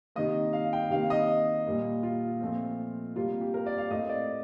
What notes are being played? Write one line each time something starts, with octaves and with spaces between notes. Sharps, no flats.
C3 D#3 A#3 D#5
F5
G5
C3 D#3 A#3 F5
D#5
A#2 G3 A#3
F4
A#2 F3 A3 C4
C3 G3 A#3 F4
G4
A#4
D5
F5
A2 A3 C4 D#5
D5